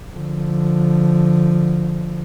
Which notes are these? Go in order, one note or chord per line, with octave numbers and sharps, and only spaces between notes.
D3 F3